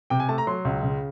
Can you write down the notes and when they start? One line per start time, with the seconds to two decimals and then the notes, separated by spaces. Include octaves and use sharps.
0.10 C3 G5
0.20 G#5
0.29 A3 A5
0.38 A#5
0.47 F#3 C6
0.65 C#2
0.83 C#3